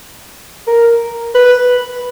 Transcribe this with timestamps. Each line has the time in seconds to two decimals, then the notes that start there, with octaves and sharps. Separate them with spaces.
0.67 A#4
1.35 B4